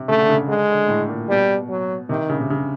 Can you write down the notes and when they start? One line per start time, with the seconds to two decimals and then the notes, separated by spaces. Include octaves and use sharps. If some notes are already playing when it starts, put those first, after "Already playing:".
Already playing: C3
0.08 C#3 A3
0.19 D3
0.29 C#3
0.48 D3 G#3
0.69 D3
0.88 A2
1.08 A#2
1.29 B2 G3
1.69 F#3
2.09 C3 D#3
2.29 C#3
2.40 C3
2.50 C#3